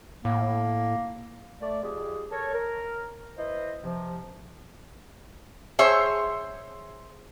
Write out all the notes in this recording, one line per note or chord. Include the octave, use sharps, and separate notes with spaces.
A2 A#3
A3 D5
F2 G4 G#4
A4 A#4 C#5
A#4
E4 B4 C5 D#5
C3 F3
G#4 C5 C#5 E5